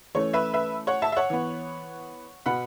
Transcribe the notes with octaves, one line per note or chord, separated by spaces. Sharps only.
E3 A3 C#4 C#5
B4 E5
B4 E5
C#5 F#5
E5 A5
E5
C#5 F#5
E3 B3
B2 B3 F#5 B5